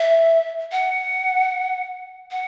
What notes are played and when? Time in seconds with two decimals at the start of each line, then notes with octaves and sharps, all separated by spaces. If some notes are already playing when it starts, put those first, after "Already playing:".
Already playing: E5
0.72 F#5
2.31 F#5